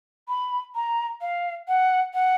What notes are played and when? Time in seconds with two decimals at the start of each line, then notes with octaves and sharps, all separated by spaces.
0.28 B5
0.75 A#5
1.21 F5
1.68 F#5
2.14 F#5